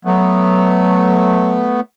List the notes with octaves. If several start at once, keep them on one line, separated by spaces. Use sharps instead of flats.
F#3 A3 B3